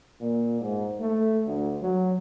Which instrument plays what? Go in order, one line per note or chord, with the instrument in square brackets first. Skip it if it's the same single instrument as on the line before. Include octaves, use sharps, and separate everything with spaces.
[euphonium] A#2
G#2
A3
D2
F#3